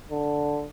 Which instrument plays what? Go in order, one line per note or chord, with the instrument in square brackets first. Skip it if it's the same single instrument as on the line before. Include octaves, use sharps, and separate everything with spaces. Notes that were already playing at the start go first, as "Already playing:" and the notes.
[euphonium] D3